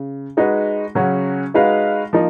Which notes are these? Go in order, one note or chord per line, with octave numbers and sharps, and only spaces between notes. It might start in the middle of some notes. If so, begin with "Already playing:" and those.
Already playing: C#3
G#3 D#4 F#4 B4
C#3 F#3 C#4 F#4
G#3 D#4 F#4 B4 F5
F3 A#3 D#4